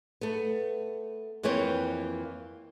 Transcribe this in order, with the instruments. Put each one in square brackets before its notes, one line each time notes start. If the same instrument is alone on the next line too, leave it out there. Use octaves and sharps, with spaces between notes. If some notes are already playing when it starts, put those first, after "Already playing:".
[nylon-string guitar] A3 B3
F2 E3 A#3 B4 C#5 G5